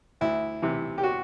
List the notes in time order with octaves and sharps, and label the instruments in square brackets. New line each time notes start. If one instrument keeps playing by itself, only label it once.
[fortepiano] D2 E4
C3 E3
G4
F#4